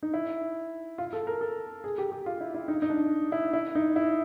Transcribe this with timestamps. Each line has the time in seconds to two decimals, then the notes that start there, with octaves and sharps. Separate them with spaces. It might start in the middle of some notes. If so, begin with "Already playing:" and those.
0.03 D#4
0.14 E4
0.98 F4
1.13 A4
1.27 A#4
1.41 A4
1.84 G#4
1.98 G4
2.12 G4
2.26 F4
2.40 E4
2.54 E4
2.68 D#4
2.82 D#4
2.90 D4
3.32 E4
3.53 E4
3.75 D#4
3.96 E4